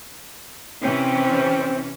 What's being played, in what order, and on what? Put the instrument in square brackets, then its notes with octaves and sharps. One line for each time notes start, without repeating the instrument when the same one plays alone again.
[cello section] C3 E3 C#4 [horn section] C4